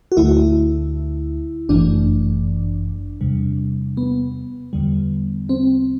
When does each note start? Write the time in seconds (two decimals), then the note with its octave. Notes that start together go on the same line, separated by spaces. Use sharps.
0.12 F#4
0.17 D2 D3 A3 E4
1.69 G1 F#2 E3 A3 D4
3.21 E2 C3 G3
3.97 B3
4.73 E2 D3 G3
5.49 C4